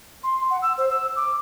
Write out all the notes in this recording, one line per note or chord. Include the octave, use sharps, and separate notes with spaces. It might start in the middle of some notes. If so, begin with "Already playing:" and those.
C6
F#5
E6
C5
E6
D6